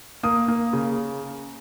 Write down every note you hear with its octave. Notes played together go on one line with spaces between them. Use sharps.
A#3 D#6
A#3
C#3